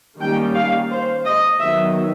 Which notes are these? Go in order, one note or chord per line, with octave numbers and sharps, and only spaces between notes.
D#3 G3 A#3 C#4 G5
F5
C5
D#5
D#3 F#3 B3 E5